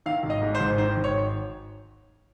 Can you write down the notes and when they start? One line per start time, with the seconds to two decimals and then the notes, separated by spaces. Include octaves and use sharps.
0.06 D#3 F5
0.23 G#1
0.30 D#5
0.42 G#2
0.55 C5
0.60 G#1
0.78 D#3 C5
0.97 G#1
1.04 C#5